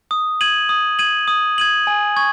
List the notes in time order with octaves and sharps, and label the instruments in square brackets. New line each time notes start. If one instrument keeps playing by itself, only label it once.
[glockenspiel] D#6
G#6 D#7 F#7
D#6
G#6 D#7 F#7
D#6
G#6 D#7 F#7
G#5
C#6 G#6